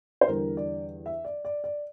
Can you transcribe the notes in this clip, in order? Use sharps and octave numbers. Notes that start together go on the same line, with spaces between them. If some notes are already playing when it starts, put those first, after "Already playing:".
C5
E2 D3 G3 A#4
D5
E5
D5
D5
D5